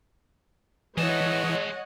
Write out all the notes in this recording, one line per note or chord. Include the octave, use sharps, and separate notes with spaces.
E3 G#3 C#5 D#5 F#5 A5